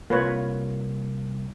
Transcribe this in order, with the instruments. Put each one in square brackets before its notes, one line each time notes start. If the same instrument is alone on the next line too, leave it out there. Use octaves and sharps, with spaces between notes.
[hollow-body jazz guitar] C2 A#3 [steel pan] F4 B4 C#5